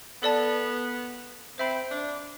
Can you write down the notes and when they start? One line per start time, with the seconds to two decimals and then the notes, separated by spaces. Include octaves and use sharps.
0.23 B3 A4 D5 A5
1.57 C4 C5 E5 B5
1.91 D4